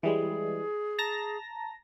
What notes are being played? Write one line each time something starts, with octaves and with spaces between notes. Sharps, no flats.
E3 G3 G#3 G#4
A5 A#5 A#6